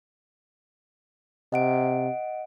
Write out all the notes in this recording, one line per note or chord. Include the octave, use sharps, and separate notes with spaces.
C3 D#5 F#5 D7